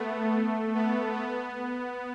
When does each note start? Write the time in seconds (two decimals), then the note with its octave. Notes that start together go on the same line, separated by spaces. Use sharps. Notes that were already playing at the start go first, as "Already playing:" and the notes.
Already playing: A3 B3
0.74 B3
1.14 B3